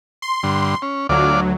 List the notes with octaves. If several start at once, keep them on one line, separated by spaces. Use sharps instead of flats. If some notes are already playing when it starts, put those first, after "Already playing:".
C6
G2 D3
C#4
D2 F#3 D4 F4 D5